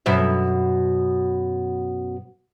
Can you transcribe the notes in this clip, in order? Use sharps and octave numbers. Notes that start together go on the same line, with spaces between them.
F#2 B2 E5